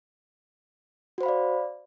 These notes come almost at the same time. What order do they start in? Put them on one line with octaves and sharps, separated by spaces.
F#4 C5 B5 F5 D5